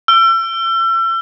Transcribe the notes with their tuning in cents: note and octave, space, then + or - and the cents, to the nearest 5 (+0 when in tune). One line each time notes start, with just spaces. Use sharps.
E6 +35